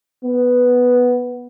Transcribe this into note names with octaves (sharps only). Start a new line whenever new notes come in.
B3